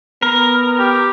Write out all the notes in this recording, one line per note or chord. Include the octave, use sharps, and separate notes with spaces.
B3 A#4
G4